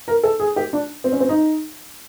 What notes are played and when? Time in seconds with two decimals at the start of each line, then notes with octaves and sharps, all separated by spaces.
0.08 A#4
0.23 A4
0.40 G#4
0.56 G4
0.73 D4
1.04 C4
1.12 C#4
1.20 C4
1.29 D#4